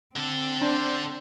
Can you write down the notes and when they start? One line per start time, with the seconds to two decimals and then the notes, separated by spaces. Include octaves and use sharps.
0.16 D3 C4 A4
0.61 D4 C5